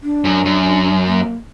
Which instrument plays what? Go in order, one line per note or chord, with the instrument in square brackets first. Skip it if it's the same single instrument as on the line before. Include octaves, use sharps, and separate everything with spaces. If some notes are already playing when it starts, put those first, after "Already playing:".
[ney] D4
[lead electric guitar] F#2
F#2
[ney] A#3